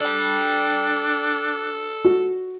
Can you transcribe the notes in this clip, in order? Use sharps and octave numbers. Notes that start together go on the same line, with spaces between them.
D4 A4 D5 G5
F#4